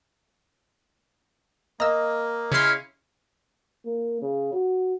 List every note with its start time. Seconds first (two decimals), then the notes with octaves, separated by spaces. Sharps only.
1.80 A#3 D#5 A#5 E6
2.52 C#3 C#4 E4 F5 C6
3.85 A#3
4.22 C#3
4.53 F#4